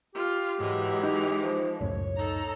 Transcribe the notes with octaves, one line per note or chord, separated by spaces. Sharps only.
F4 G4
G#2 E3 F#3 G#3
D#4
F3
C#2 F#2 A2 C#5
D#4 A4 A#5